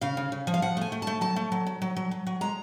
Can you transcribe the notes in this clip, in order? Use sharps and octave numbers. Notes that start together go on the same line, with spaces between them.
C#3 F5
C#3
C#3
F3
F5
F3 F#5
A3 G#5
A3
A3 A5
F#3 A5
A3
F#3
F#3
F#3
F#3
F#3
F#3
G#3 A#5